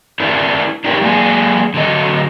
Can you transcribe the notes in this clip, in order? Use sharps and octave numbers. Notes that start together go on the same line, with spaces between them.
D4 E4 A#4 C5
D4 D#4 G4 A#4 B4 C#5
F#3 G#3 A#3 D5 G#5
D3 F#3 D#5